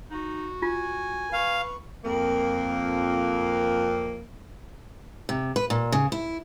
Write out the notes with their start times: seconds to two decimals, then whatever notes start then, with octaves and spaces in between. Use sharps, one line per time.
0.11 D#4 F#4
0.62 F4 G#5
1.33 B4 F5 C#6
2.04 F2 A#3
5.29 C3
5.56 B4
5.70 A#2
5.92 C#3
6.12 E4